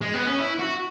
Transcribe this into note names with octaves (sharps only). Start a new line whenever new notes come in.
G#3
B3
C#4
E4
F#4